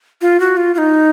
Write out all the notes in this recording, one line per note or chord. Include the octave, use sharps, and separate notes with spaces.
F4
F#4
F4
F4
D#4